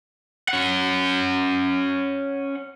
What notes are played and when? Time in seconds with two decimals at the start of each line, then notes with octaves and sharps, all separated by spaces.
0.48 C#4 F#5